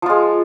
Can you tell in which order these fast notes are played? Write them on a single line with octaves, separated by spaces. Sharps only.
F3 F4 G#3